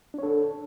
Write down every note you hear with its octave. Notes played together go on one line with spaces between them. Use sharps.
D4 A4 C#5